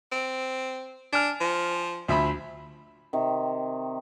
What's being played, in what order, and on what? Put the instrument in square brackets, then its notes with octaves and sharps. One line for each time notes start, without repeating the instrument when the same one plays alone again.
[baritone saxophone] C4
[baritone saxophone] D4 [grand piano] G#5 F6
[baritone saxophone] F3
[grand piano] D2 E5 B5 [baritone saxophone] F3
[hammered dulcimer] C3 D#3